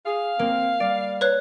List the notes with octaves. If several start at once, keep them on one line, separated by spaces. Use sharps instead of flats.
G#4 F5
A#3 C4
G3 D5
B4 C#5 F#6